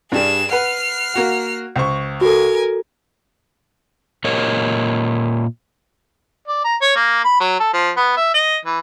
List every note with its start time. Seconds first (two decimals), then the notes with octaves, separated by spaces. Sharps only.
0.12 G2 G3 G#4 E7
0.51 B4 F#5 F6 C7
1.14 A#3 F#4 F#5
1.76 C#2 C5 C#6
2.21 F#4 A4 A#4 G#5
4.24 A#2 A#4 C#5 D#5
6.48 D5
6.65 A#5
6.82 C#5
6.96 A#3
7.25 B5
7.40 F#3
7.60 A4
7.74 F3
7.97 B3
8.17 E5
8.34 D#5
8.65 E3